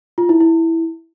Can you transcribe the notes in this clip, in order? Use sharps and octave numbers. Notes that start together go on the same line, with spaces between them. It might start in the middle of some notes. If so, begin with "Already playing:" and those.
F4
E4
E4